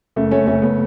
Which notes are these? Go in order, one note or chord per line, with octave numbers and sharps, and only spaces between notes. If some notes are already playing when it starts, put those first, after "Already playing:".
F#1 A3
A3 C#4
F#1 A3 C#4
B3